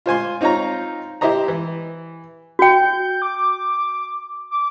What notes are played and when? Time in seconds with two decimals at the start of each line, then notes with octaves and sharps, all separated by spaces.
0.06 F4 C5 G#5 C6
0.41 C4 D#4 F4 C#5 A#5
1.21 E4 G4 C5 D#5 A#5
1.48 E3
2.59 F#4 G5 G6
3.22 D6
4.51 D6